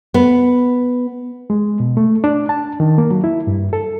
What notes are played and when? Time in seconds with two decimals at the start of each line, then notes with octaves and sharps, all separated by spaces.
0.14 B3
1.50 G#3
1.80 B2
1.97 A3
2.24 D4
2.49 A5
2.80 D#3
2.98 A#3
3.11 F#3
3.24 E4
3.47 G2
3.73 A4